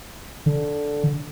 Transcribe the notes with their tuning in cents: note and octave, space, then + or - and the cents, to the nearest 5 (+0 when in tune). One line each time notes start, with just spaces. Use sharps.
D3 -5